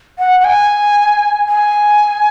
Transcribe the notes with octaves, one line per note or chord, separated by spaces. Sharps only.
F#5
F#5
G#5
G#5